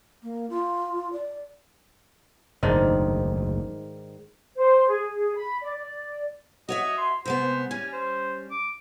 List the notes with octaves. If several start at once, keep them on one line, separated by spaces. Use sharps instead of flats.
A#3
F4
D5
F#1 D2 G#2 D#3 D4
C5
G#4
G#4
B5
D5
D5
F#4 C#5 D#5 E5
C6
C3 G#3 B3 C5
G3 C#4 G#5
C5
D6